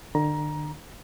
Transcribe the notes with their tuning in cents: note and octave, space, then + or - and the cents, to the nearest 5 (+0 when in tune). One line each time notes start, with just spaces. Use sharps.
D3 +40 A#5 +20